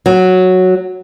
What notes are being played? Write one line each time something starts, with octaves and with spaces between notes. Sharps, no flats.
F#3